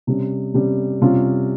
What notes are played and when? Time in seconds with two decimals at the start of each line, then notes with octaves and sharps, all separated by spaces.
0.07 C3 G3 C#4
0.54 C3 G3 C#4
1.02 C3 G3 C#4 F4